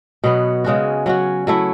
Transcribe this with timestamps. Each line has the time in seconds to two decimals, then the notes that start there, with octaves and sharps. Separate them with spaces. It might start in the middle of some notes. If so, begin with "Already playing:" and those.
0.24 B2 F#3 B3
0.64 C#3 G#3 C#4 F#4
1.06 F#3 C#4 F#4
1.47 F#3 A3 E4